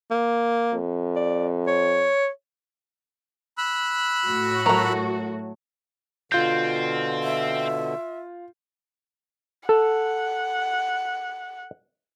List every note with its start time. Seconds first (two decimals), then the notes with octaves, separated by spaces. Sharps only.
0.11 A#3
0.73 F2
1.16 D5
1.67 C#5
3.58 B5 E6 F#6
4.27 A2 F#4
4.66 F#3 A3 A#4 A#5
6.32 B2 D3 C4 F4 G6
7.23 E5
9.69 A4 F#5